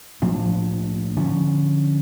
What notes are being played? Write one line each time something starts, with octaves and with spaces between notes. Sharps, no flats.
A2 F3 A#3 D4
D3 F3 C#4